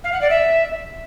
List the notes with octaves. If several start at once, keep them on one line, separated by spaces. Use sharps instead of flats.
F5
F#5
D5
E5